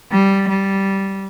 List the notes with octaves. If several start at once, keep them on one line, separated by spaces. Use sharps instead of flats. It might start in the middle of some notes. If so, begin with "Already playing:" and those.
G3
G3